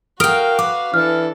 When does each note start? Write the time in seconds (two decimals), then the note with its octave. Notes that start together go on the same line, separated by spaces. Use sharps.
0.20 F#4 A#4 F5 G5 D#6 F6 D7
0.59 B4 D6
0.94 E3 D4 A4 F6